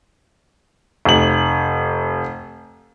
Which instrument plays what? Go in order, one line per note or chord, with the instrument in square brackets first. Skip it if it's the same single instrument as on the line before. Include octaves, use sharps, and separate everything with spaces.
[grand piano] F1 F#7